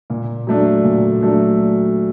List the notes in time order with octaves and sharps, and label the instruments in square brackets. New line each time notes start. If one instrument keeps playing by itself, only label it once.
[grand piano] A#2
F#3 A3 D4
A#2
F#3 A3 D4